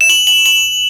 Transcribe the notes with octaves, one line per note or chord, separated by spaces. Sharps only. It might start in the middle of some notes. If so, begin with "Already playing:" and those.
E7
F#7
F#7
F#7